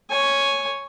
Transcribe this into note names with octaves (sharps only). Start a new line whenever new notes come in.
C#5 G#5